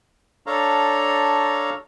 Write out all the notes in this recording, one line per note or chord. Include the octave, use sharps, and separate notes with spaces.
D4 A4 C#5 F5 A#5